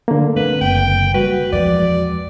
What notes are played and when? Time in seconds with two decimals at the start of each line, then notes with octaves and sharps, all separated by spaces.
0.08 D3 A#3
0.36 A3 C4 B4
0.61 F#1 G5
1.14 G3 F#4 B4
1.52 E2 F3 G#3 D5